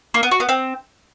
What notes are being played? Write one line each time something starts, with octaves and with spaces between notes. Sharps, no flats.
A#3
B3
F#4
B3
C4